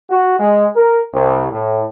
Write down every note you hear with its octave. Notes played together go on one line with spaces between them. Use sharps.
F#4
G#3
A#4
C2
A2